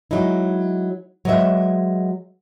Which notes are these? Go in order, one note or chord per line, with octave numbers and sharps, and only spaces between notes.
F#3 G#3 D#4 E4
F#3 G#3 B4 D#5 E5